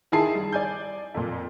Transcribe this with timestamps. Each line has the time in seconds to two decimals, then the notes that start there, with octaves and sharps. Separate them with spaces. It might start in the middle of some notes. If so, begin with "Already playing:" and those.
0.12 D#3 E4 G#4 G#5 A5 C7
0.35 G3
0.53 D5 G#5 G6
1.14 F2 A#2